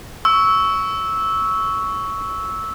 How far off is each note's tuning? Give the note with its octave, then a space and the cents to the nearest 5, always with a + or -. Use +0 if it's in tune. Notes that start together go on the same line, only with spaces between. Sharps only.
C#6 +10 E6 -10